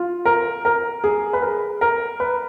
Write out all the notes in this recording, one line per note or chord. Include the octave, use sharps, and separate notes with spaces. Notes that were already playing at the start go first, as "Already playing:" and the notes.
Already playing: F4
A#4
A#4
G#4
B4
A#4
A#4
B4